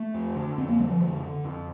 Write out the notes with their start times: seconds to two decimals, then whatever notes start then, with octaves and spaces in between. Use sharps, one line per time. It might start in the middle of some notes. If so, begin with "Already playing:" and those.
Already playing: A3
0.14 F2
0.36 D3
0.58 F2 C4
0.68 A#3
0.79 D3 G3
0.90 F3
1.01 F2 D3
1.23 D3
1.44 F2